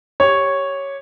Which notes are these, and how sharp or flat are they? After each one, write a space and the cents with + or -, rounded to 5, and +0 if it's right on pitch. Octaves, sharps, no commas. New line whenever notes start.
G4 +0 C#5 -5